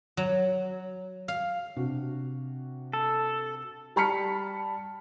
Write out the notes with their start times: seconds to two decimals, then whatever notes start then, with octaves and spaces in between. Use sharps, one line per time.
0.17 F#3
1.28 F5
1.76 C3 D4 F#4
2.93 A4
3.96 G3 A5 B5 F6 B6 C#7